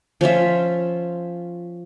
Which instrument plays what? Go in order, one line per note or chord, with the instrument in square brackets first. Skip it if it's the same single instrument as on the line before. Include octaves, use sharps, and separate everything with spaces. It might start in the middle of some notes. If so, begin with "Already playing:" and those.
[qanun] F3 C#4 F4 E5